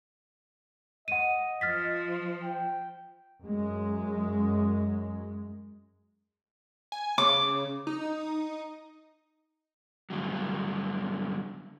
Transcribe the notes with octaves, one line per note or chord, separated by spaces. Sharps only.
D#5 F#5 D#7
F3 F6 A6 B6
G5
F#2 G#3
G#5
C#3 D6
D#4
G2 D3 F#3